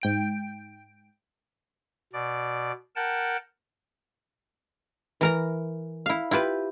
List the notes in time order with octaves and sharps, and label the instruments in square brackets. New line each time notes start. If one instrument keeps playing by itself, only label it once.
[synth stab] G#2 G5 D7
[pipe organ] B2 D5
A#4 F#5 G5 A5
[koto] E3 A#4 A#5
E4 F5
E4 F4 G4 B4